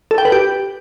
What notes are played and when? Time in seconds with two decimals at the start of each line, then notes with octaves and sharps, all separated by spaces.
0.11 A4
0.18 G5
0.25 B4
0.32 G4